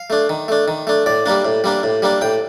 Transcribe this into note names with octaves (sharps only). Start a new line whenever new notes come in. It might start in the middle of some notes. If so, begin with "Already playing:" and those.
Already playing: F5
A3 D4
D#3
A3 D4
D#3
A3 D4
A2 D5
G3 A#3 D4
A2
G3 A#3 D4
A2
G3 A#3 D4
A2 G5